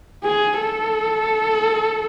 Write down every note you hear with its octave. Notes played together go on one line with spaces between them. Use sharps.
G#4
A4